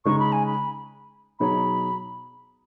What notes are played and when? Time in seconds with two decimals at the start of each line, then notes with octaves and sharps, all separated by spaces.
0.05 C#3 G#3 D#4 C#6
0.19 B5
0.32 G#5
0.46 B5
1.39 B2 F#3 D#4 G#4 C#5 B5